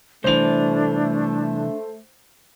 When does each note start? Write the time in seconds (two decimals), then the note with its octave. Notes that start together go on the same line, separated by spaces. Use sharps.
0.24 C2 E3 A3 D4 C5 F7